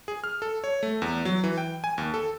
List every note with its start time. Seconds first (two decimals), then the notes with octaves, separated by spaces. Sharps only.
0.08 G#4
0.24 F6
0.42 A4
0.64 C#5
0.83 A3
1.02 E2
1.25 F#3
1.44 E3
1.58 G5
1.84 G#5
1.98 D#2
2.14 A4